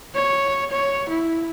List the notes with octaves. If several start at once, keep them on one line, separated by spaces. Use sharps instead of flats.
C#5
C#5
E4